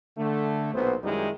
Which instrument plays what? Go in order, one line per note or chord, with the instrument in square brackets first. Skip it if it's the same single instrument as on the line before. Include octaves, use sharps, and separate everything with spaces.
[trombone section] D3 A3
B1 A#2 B3 C5
F#2 D#3 G3 G#3 D#4 E4